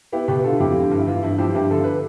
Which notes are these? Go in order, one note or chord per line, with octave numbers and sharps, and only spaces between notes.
B3 E4 G4
B2 G4 B4
D3 F4 A4
F2 E4 G4
D3
G2
E4
E3 F4
G2 E4
F3 E4 G4
G2 E4 G4
D3 A4
B4